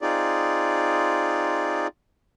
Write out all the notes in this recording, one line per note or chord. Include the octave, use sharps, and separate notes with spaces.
C4 D#4 F4 G#4 D5